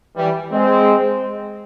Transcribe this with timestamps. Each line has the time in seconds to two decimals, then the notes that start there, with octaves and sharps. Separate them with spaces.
0.17 E3 G3
0.52 G#3 C4